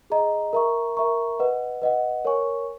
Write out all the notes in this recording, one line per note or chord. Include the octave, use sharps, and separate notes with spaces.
G#4 D#5 A#5
A#4 E5 A#5 C#6
A#4 E5 A#5 C#6
B4 D#5 F#5
B4 D#5 F#5
A#4 C#5 G#5 C#6